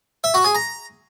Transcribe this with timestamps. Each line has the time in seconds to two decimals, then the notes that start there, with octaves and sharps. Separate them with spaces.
0.24 E5
0.34 F#4
0.44 G#4
0.55 A#5